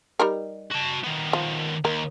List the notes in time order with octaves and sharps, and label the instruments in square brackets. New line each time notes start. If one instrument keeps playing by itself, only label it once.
[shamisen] G3 D#4 A#4
[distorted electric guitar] F#4 A5
D#3 B3
[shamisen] F3
[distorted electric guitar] D#2 [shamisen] A#4